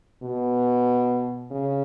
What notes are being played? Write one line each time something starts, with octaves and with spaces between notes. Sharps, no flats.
B2
C#3